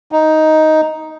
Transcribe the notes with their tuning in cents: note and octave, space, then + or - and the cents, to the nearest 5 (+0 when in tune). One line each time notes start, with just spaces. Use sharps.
D#4 +5